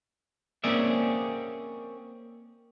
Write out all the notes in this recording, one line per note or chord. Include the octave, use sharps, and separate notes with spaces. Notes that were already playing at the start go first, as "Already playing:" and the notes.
A#3 C4 C#4 G#4 D5 E5